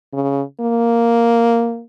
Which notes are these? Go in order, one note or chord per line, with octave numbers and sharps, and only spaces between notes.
C#3
A#3